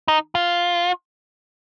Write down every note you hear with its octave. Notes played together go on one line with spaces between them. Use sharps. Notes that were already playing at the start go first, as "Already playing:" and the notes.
D#4
F4